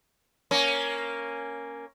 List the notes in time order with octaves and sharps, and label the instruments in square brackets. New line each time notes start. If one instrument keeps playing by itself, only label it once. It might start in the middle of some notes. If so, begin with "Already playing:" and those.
[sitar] A#3 C#4